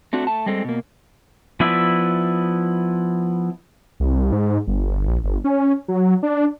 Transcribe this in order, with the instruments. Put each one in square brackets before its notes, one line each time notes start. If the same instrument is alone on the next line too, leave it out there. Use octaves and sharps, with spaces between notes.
[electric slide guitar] A3 C4 D4 F#4
A3 A5
G3 G#3 C4 A4
B2 A#3
[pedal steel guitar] F3 B3 E4 D5 E5
[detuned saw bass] C2
G#2
G1
A#1
G1
C#4
F#3
D4